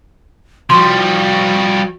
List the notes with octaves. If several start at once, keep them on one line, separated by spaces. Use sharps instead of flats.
F3 G3 F#4 C6 C#6